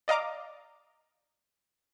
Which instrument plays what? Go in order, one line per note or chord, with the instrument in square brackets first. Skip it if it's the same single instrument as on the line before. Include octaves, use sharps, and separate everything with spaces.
[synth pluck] D5 D#5 F5 A#5 D6